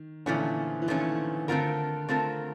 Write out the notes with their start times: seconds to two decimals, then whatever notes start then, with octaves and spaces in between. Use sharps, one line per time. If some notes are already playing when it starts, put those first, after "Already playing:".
Already playing: D#3
0.26 A#2 D3 E3 F3 A3 C#4
0.82 E3
0.88 A#2 D#3 F3 A3 C#4
1.48 D3 A3 C4 F4 A#4
2.09 A3 C4 F4 A#4